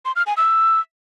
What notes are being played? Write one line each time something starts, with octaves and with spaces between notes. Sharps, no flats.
C6
F6
G#5
E6